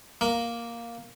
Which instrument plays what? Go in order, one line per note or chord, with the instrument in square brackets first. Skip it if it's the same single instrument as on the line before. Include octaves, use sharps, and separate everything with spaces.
[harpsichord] A#3